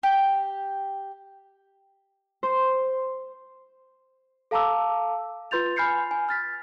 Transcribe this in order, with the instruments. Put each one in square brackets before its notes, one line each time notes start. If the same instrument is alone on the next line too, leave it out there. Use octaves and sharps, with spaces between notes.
[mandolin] G4
[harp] C5
[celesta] A4 F5 A5 A#5 D6 E6
F4 B4 C6 G6 A6 F7
G#5 B5 F6 G6 C7 C#7
G#5
F6 A6 B6